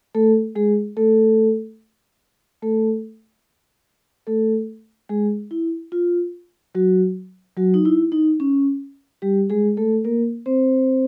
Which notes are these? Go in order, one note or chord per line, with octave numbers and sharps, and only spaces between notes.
A3 A4
G#3 G#4
A3 A4
A3 A4
A3 A4
G#3 G#4
E4
F4
F#3 F#4
F#3 F#4
D#4
E4
D#4
C#4
G3 G4
G#3 G#4
A3 A4
A#3 A#4
C4 C5